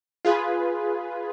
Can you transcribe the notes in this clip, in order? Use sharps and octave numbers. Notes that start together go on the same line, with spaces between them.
F4 G#4 B4